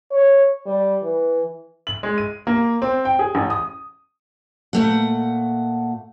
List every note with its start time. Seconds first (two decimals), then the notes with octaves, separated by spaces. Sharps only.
0.11 C#5
0.66 G3
1.03 E3
1.87 F#7
2.03 G#3
2.18 D#7
2.47 A#3
2.82 C4
3.05 G5
3.19 G#4
3.35 A1
3.50 D#6
4.73 A#2 A3 F#5